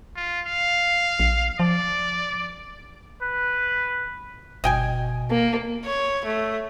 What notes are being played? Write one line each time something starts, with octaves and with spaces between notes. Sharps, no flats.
F4
F5
A#1
F3 D5
B4
G1 B2 D#5 G5 G#5
A#3
C#5
A3